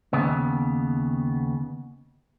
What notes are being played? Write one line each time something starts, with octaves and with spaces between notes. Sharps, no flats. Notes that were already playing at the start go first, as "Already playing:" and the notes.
D#2 C#3 B3